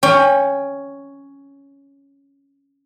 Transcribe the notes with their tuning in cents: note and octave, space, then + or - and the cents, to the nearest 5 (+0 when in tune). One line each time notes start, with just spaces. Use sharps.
C#4 +5 G5 +25